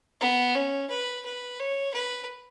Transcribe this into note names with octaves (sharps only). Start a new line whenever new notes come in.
B3
C#4
B4
B4
C#5
B4